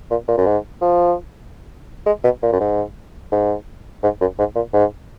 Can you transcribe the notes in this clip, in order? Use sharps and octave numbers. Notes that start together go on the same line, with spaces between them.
A#2
A#2
F#2
G#2
F3
G#3
B2
A#2
F#2
G#2
G#2
G#2
F#2
G#2
A#2
G#2